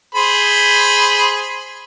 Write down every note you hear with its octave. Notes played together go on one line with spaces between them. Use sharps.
G#4 C5 B5